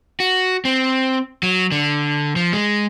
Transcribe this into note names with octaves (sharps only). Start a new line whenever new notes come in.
F#4
C4
F#3
D3
F3
G#3